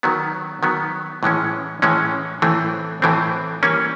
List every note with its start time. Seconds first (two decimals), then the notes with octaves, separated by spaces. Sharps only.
0.03 D#3 F#3 B3
0.63 D#3 F#3 B3
1.23 A2 E3 G#3 C#4
1.82 A2 E3 G#3 C#4
2.42 A2 E3 A3 C4
3.02 A2 E3 A3 C4
3.63 E3 G3 A#3 C#4